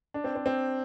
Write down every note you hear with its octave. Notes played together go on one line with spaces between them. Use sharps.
D4
C4
C4
C4